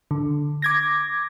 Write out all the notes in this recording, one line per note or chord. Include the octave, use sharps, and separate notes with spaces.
D3
D6 G#6 A#6